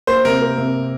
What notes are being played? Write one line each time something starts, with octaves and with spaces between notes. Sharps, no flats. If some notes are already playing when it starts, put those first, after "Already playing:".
A#3 C5
C3 A#4
A#3
C3